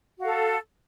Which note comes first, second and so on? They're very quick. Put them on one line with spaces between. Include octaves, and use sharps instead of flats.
F#4 F5 A4